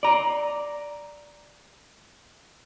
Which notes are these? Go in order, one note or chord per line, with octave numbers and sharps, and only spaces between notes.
D5 A#5